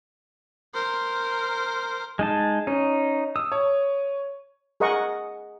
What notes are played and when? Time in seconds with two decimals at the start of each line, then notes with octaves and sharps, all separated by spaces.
0.74 A#4 C5
2.19 G#3 D#4 A5
2.67 C#4 D#4
3.36 D#6 E6
3.52 C#5
4.80 G#4 A#4 D#5 F#5 C#6